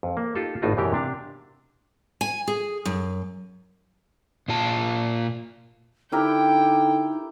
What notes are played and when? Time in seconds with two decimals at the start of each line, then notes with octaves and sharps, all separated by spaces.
0.03 F2
0.17 A#3
0.36 D#4 F4 G4 A4
0.62 G#1 A2 D#4 F4 F#4
0.77 F#2 B2 E3 G4 A#4
0.92 C3 D4 F5
2.21 G#5
2.48 G#4
2.85 F#2
4.48 A#2 F4 A5
6.12 D3 D#4 E4 G4 A#4 G5